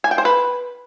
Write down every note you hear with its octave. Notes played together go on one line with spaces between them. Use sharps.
G#5
G5
C5
B4